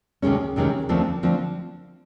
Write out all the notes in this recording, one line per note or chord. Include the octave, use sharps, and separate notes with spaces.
D2 C3 D#3 G#3 C#4
D2 C3 D#3 G#3 C#4
D#2 D3 F3 A3 C4
D3 F3 A3 C4